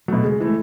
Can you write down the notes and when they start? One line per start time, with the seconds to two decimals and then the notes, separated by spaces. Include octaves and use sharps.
0.08 B2 F#3 A3
0.24 C#3 G#3
0.40 E3 G#3 A3